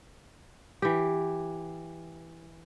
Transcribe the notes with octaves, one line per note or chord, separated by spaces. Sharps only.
E3 G4